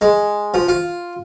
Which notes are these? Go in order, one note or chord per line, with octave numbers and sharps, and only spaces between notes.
G#3
F3
F4